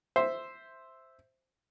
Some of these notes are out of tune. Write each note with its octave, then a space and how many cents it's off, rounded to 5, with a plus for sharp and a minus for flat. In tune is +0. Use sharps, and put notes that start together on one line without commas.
C5 +0 E5 +0